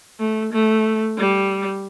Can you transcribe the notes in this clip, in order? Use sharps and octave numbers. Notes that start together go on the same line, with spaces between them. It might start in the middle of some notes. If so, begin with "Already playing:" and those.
A3
A3
G3